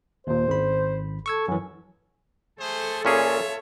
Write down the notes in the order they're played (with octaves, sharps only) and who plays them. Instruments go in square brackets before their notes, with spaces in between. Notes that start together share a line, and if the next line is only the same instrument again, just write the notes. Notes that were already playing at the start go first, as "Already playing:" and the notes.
[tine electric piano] D#2 A#2 [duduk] C5
[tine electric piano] G#1 B5
[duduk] A4 [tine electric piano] C#6 E6 G#6
[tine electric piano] F#2 E3 [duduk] C#4
[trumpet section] A3 G#4 C5 [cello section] A4
[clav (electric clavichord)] A#2 C#4 G#4 [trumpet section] F4 C#5 E5